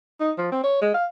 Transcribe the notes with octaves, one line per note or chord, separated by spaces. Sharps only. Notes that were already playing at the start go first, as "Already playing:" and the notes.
D#4
F3
C4
C#5
G#3
F5